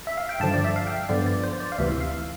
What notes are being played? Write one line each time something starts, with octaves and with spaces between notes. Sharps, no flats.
E5
F5
G5
G2 D3 F3 A5
D5
E5
F5
G5
G2 D3 F3 B3 D5
D5
C5
D5
F5
D2 C3 E3 E5
F5